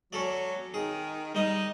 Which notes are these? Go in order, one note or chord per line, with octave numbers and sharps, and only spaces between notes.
F#3 C#4 A4 D5
D#3 G#4
G3 D#4 D#5